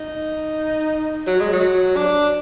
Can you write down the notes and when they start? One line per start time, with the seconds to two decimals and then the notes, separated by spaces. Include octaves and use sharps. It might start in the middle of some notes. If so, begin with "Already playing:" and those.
Already playing: D#4
1.27 F#3
1.40 G#3
1.53 F#3
1.96 D4